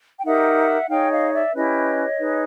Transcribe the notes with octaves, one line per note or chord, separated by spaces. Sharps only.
G5
D#4 G4 A#4 E5 F#5
D#4 G#4 C#5 F5 G5
D#5 F5
D5 E5
C#4 E4 G4 B4 C#5 D#5
D#4 G#4 B4